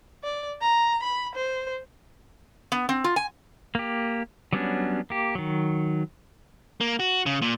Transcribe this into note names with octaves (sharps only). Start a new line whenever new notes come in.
D5
A#5
B5
C5
B3
C4
F4
G#5
A#3 G4
F#3 G3 B3 C#4 D4
A#3 G4
D#3 F#3
A#3
F#4
C#3
A#2